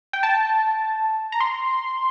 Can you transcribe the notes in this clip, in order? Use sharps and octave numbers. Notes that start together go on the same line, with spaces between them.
G5
A5
A#5
C6